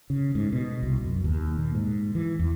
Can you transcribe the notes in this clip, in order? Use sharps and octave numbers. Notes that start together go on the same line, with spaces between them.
C#3
G#2
B2
C2
F#2
D#2
A#2
G#2
E3
E2